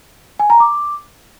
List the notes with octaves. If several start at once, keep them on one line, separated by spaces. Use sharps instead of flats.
G#5
A#5
D6